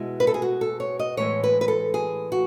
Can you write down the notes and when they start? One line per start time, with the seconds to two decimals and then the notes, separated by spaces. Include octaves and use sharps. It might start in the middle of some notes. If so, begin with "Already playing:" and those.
Already playing: B2 G#3 B3 E4
0.20 B4
0.27 A4
0.34 G#4
0.42 F#4
0.61 A4
0.80 C#5
0.99 D#5
1.17 A2 E3 G#3 B3 C#5
1.44 B4
1.61 B4
1.68 A4
1.94 G#4
2.32 F#4